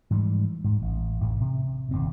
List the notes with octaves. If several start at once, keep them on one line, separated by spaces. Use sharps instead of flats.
G#2 E3 F3 G3
G#2
A1
A1 D2 A2
C3
D#1 D#2 C4